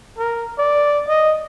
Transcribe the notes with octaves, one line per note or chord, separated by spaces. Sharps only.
A#4
D5
D#5